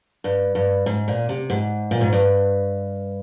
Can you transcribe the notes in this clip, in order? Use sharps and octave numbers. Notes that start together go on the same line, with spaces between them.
G2
G2
G#2
A#2
C3
G#2
A#2
G#2
G2